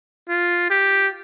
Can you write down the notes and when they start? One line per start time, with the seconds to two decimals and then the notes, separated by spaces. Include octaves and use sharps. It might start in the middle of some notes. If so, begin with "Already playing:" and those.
0.29 F4
0.70 G4